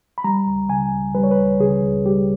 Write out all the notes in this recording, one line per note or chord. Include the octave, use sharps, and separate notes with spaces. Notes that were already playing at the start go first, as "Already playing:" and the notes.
B5
G3 A#5
C#2
C#3 G#5
C#2
G3 B4
C#5
B4
C#2
C#3 G#4
C#2
G3 G4